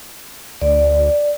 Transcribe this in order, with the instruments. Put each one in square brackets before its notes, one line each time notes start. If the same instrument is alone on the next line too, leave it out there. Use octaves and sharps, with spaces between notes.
[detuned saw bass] D2 [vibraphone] D5